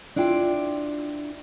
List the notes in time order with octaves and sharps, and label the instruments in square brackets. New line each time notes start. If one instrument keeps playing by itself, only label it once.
[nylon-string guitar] D4 E4 F4 G5